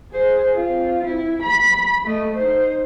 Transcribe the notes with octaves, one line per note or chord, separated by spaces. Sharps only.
G#4 C5
C4 F4
E4
B5
A3 D#5
D#4 C5